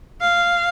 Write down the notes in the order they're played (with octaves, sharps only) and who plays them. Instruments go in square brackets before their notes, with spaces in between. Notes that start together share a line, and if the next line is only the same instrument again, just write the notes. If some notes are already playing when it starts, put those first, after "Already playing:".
[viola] F5